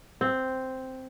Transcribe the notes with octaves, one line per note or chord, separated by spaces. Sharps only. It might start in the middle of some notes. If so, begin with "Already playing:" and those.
C4